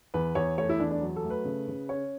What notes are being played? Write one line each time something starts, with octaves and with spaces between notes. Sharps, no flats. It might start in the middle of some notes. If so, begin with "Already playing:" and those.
E2 B4
E2 C#5
A3 C#5
E4
E2 D4
D4
F#3
A4
A3
B4
C#3
C#3
C#4 C#5